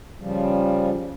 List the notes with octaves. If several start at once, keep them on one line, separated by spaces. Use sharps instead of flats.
C#3 F3 G3